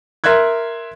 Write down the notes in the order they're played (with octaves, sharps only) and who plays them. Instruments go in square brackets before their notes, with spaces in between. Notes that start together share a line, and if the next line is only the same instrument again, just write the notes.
[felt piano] A#4 E5 C6 F#6 G#6